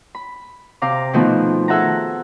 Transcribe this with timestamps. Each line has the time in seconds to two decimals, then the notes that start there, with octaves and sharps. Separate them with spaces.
0.15 B5
0.82 C3 F5 A#5 D6
1.13 B2 D#3 F3 A3 B3 C4
1.68 G#4 A4 E5 F#5 A5 A#5